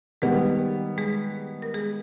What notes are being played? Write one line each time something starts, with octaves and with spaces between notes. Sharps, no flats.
D#3 G3 G#3 B3 G#4
G#3 G#4
A#4
G#3 G#4